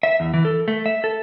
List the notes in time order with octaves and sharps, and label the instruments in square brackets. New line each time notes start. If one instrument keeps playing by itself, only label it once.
[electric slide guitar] E5
E2
E3
A4
A3
E5
A4